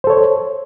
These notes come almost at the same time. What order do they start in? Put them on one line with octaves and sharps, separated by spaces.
C5 A4 C#5